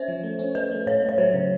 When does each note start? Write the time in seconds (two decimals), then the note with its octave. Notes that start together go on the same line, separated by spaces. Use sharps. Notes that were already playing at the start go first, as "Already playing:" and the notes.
Already playing: C#4 C5
0.08 F3
0.23 A3
0.39 C#4
0.55 A3 B4
0.71 A3
0.86 A2 C#5
1.02 A3
1.09 C#5
1.18 F#3 C5
1.34 C#3